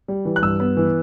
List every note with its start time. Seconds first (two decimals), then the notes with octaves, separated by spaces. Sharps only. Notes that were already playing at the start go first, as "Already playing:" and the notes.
0.08 G3
0.25 E3
0.36 F#6
0.42 G2 E6
0.60 B3
0.77 E3